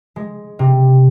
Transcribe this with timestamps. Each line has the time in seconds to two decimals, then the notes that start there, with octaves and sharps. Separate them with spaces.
0.16 G#3
0.59 C3